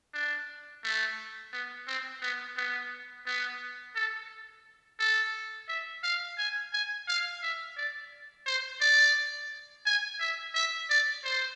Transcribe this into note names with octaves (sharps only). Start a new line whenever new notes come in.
D4
A3
B3
C4
B3
B3
B3
A4
A4
E5
F5
G#5
G#5
F5
E5
D5
C5
D5
G#5
E5
E5
D5
C5